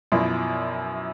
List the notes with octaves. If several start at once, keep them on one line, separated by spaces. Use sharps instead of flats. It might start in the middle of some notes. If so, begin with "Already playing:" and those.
F#2 B2 F3 E4 D5 C6